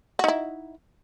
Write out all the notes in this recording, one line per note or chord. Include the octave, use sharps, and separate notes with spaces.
D#4 E4 F#4